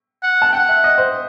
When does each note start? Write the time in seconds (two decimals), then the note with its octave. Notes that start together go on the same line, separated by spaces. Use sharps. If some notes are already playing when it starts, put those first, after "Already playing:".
0.23 F#5
0.42 A5
0.53 F#5 G5
0.69 E5
0.84 D#5
0.98 C5